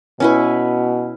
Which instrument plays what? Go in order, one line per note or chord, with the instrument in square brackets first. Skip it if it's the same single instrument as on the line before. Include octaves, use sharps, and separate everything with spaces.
[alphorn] B2 [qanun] C#4 E4 B4